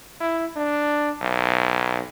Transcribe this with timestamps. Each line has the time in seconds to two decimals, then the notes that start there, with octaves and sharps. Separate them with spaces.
0.20 E4
0.56 D4
1.21 B1